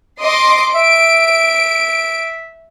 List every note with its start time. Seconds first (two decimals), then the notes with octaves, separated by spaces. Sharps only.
0.20 D#5 C6 D6
0.75 E5 D7